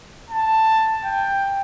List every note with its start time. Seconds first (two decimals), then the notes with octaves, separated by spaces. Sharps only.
0.30 A5
1.05 G5